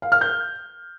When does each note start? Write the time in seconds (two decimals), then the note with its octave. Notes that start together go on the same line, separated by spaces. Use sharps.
0.02 F5
0.12 F6
0.21 G6